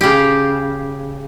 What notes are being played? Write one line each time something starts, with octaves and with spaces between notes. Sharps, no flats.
C#3 G4